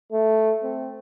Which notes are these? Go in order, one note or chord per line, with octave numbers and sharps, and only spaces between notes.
A3
C4